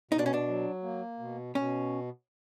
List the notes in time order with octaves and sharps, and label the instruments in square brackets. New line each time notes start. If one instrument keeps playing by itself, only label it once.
[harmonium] B2 [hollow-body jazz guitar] D#4
[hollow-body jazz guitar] D4
C#4
D4
[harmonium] F#3
A#3
B2
[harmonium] B2 [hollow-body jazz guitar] C#4